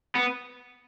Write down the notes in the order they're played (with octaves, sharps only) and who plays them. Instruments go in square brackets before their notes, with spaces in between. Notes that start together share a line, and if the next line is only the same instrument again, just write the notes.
[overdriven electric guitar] B3